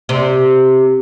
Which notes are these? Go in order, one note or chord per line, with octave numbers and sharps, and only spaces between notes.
C3